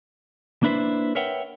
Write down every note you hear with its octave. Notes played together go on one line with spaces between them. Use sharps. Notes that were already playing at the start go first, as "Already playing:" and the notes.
A#3 D4 E4 B4 C5
A#4 B4 C#5 E5 F#5 G5